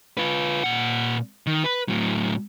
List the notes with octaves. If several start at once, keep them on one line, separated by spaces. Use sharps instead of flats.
F4 B4
A#2 F#5
D#3
B4
A2 F#3